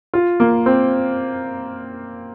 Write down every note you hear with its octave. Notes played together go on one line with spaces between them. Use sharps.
F4
A#3
C4